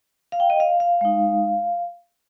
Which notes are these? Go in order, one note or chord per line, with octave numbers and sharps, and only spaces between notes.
F5
G5
D#5
F5
F5
G#3 D#4